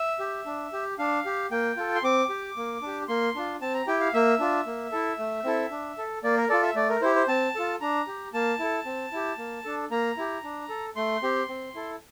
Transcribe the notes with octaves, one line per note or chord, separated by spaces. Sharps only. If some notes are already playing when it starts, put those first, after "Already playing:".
Already playing: E5
G4
D4
G4
D4 F5
G4
A#3 G5
F4 A4
C6
C4 D6
G4
A#3
D4 G4
A#3 C6
D4 F4
C4 A5
A#5
E4 G4 G5
F5
A#3 E5
D4 F4
A#3
E4 A4
A3
C4 E4 A4
D4
A4
A#3 D5
A#4
F4 A4 D5
E5
A3 D5
A#4
E4 G4 C5
C5
C4 A5
F4 A4
D4 A#5
G4
A#3 A5
E4 A4
C4
E4 G4
A#3
D4 A4
A#3 A#5
E4 G4
D4
A4
A3 C6
C4 G4
C4
E4 A4